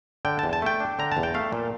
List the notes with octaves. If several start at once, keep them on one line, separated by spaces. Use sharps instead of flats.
D3 G5
E2 A5
A5
A3 G5
D4
D3 A#5
A5
E2
G5
A3 F5
A#2